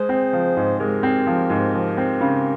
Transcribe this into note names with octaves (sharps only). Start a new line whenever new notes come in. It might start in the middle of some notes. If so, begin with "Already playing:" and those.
Already playing: G#3 G#4 C5
C4
F3
G#2
G#3 G4 A#4
C4
F3
G#2
F3
C4
C#3